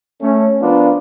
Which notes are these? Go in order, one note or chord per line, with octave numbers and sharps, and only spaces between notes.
A3 C#4
F3 B3 D4 F4 A#4 B4